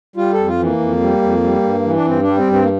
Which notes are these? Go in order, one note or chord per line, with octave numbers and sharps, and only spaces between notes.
G3 F4
A4
F2
F4
E3
A#3
F2
G3
F2
G3
G2
E3
D4
G2 C4
D4
G3
C4
G2
C4
A#3